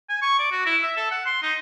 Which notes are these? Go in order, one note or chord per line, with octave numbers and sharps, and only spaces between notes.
G#5
C#6
D5
F#4
E4
E5
A4
F#5
C6
D#4